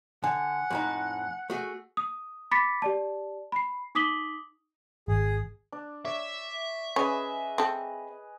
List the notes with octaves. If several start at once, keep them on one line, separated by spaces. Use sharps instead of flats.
D3 F#5 G#5
F2 A2 D#4
A3 F#4 G#4
D#6
B5 D6 A6 B6 C#7
G4 D5 A5
B5 C7
D#4 D6 D#6 B6 F#7 G7
G#1 G#4
D4
C#5 D5 E5
C#4 G#4 B4 D#5
C4 A4